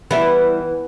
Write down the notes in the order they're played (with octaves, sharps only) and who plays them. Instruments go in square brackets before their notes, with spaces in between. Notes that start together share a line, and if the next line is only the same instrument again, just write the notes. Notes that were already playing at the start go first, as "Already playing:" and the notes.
[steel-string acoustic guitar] E3 [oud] G3 E4 [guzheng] B3